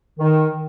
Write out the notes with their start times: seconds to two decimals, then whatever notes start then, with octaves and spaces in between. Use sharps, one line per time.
0.19 D#3